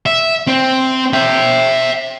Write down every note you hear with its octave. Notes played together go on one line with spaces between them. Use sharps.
E5
C4
E5 G5